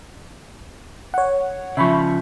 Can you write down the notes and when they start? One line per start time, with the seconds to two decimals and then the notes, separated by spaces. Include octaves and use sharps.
1.14 C#5 F#5
1.77 C#3 F3 E5 B5 C#6